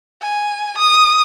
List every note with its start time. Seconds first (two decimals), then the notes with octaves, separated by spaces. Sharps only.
0.22 G#5
0.77 D#6